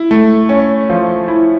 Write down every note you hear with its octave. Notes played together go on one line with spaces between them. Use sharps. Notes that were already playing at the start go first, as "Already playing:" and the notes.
Already playing: E4
A3
C#4
F3
E4